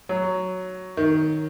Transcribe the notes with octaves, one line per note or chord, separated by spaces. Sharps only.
F#3
D#3